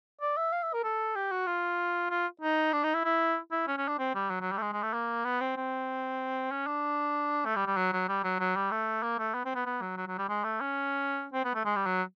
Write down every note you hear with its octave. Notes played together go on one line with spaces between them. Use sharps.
D5
E5
F5
E5
A#4
A4
G4
F#4
F4
F4
D#4
D4
D#4
E4
E4
E4
C#4
C#4
D4
C4
G3
F#3
F#3
G3
A3
G#3
G#3
A3
A#3
B3
C4
C4
C#4
D4
A3
G3
G3
F#3
F#3
G3
F#3
F#3
G3
A3
A#3
A3
B3
C4
B3
B3
F#3
F#3
F#3
G3
G#3
A3
C#4
C4
B3
A3
G#3
G3
F#3